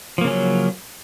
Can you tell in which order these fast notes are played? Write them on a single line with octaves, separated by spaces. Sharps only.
F3 A#3 C#3 C#4 F#3